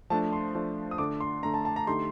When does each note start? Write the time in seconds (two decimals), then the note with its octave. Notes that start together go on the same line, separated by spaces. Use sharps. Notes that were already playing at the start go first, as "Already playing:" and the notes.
0.10 F3 A3 D4 A5
0.33 C6
0.55 F3 A3 D4
0.91 D#6
0.98 D3 A3 D4 D6
1.20 C6
1.43 D3 A3 D4 A#5
1.54 A5
1.65 A5
1.76 A#5
1.87 D3 A3 D#4 G4 C6